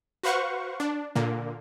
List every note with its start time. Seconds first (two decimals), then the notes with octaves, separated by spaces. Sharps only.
0.23 F#4 B4 C5 F5 F#5 C#6
0.80 D4
1.15 A#2 D3 A#3